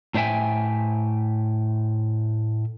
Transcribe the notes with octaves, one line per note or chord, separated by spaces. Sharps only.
A2 D4 C5 E5 G5 G#5